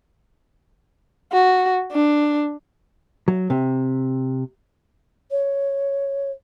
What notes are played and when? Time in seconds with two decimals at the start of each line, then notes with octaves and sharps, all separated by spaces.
1.32 F#4
1.92 D4
3.28 F#3
3.50 C3
5.30 C#5